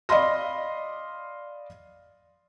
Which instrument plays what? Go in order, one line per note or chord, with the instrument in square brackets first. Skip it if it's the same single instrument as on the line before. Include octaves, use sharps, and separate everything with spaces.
[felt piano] D5 D#5 F5 B5 C6 A#6